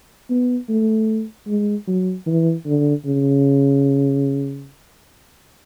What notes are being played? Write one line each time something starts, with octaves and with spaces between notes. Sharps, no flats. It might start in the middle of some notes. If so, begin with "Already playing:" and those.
B3
A3
G#3
F#3
E3
D3
C#3